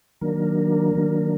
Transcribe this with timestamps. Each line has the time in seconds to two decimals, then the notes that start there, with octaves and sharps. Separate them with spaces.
0.21 D#3 F#3 A#3 D4 A#4
0.95 D#3 F#3 A#3 D4